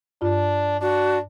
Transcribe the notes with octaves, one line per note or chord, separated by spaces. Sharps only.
G2 D4 F4
D4 F#4